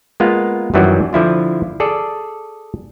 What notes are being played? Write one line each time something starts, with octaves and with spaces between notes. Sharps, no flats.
G#3 A#3 B3 F4 F5
F#2 D#3 E3 F#3 G3
D3 F3 E4 F4
G#4 A4 D5